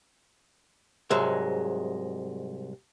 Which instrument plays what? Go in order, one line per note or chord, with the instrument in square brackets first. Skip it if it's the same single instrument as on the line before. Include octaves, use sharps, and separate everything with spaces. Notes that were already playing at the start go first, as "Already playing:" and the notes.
[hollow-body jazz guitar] C2 G#2 F#3 G#3 E5